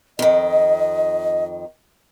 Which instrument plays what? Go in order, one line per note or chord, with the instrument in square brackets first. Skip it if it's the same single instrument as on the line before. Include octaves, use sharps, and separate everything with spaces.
[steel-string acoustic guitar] F2 D#3 [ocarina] D#5